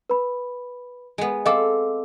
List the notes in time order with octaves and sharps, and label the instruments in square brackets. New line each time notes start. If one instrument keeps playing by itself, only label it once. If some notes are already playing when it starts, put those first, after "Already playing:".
[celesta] B4 B5
[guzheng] G#3 B3
[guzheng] C4 A4 [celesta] D#5 F5 D6